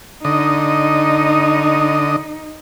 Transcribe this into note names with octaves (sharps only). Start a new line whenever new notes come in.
D3 D#4 D#5